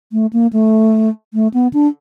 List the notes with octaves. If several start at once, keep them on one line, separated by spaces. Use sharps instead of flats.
A3
A#3
A3
A3
B3
D4